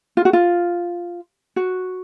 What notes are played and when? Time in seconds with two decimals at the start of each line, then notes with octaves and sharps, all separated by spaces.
0.17 F4
0.25 F#4
0.33 F4
1.56 F#4